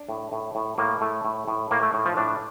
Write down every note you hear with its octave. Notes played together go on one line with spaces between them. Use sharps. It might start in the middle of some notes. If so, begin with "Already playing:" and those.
Already playing: D4
A2
A2
A2
A2 A#3
A2 A3
A2
A2
A2 A#3
A3
A2
F3
A2 D4